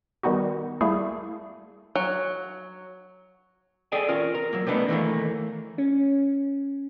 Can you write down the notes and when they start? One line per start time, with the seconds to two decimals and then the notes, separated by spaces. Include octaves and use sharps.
0.23 D#3 G3 B3 D#4 F#4
0.81 G3 A3 A#3 E4 G#4
1.95 F#3
3.92 G#4 A4 D5 D#5 G5 G#5
4.08 C#4 F4 A#4
4.34 A#4
4.53 F#3 A#3
4.66 G3 A3 B3 D4 D#4
4.88 D#3 E3 A3 A#3
5.78 C#4